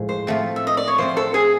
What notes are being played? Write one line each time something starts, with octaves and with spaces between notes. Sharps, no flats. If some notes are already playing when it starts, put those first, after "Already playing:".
Already playing: A2 F3 G#3
C5
F3 A3 C4
E5
D#5
D5
C#5
F3 A3 C4 C5
A4
G#4